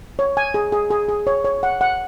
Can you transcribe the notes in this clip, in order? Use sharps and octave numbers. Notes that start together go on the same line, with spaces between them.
C#5
G#5
G#4
G#4
G#4
G#4
C#5
C#5
F#5
F#5